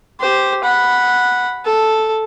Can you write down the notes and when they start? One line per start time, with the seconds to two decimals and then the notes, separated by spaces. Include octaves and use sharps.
0.20 G4 C5
0.64 F#5 B5
1.65 A4